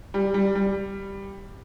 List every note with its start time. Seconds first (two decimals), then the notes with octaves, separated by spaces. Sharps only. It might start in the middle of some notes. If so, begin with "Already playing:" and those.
0.14 G3
0.34 G3
0.55 G3